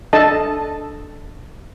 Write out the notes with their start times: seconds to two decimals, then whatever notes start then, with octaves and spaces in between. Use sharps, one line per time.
0.13 D4 A4 D#5 A5